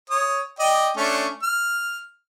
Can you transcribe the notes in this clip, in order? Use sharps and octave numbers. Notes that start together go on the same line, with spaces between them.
C#5 D#6
D5 D#5 G5
A3 C#4 D4
F6